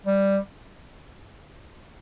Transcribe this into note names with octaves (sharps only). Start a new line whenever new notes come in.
G3